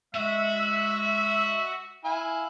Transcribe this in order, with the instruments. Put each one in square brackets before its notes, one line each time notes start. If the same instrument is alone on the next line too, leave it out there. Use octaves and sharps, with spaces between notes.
[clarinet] G#3 [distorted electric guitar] F#4 [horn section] E5
[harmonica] E4 G#5 [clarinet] F5